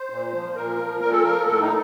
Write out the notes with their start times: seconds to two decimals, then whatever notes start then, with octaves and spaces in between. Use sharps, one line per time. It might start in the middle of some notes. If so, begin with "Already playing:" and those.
Already playing: C5
0.10 A#2
0.33 F3
0.55 A#2 A#4
0.77 F3
1.00 A#2 A#4
1.11 A4
1.23 F3 A#4
1.46 A2 A4
1.62 D#4